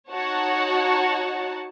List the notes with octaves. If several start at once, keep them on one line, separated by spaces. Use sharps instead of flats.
D#4 F#4 C#5 F#5 A5